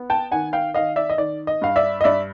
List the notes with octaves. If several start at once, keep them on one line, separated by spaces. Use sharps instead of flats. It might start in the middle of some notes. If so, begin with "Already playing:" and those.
Already playing: B3
G5 A5
D#3 F#5 G#5
F5 G5
D#3 D#5 F5
D5 E5
D#5
D#3 D5
D#5
G2 F5
D5 E5
D#5
G2 D5 E5